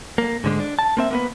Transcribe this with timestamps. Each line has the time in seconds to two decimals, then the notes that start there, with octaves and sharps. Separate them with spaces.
0.18 A#3
0.44 G#2 D3 G#3
0.60 D4
0.79 A5
0.97 A#3 C4 E5
1.11 A#3 B3 B4